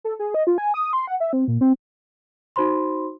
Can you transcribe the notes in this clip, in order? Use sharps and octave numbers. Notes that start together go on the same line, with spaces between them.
A4
G#4
D#5
F4
G#5
D#6
C6
F#5
E5
C4
A#2
C4
D#4 F#4 C5 B5 C6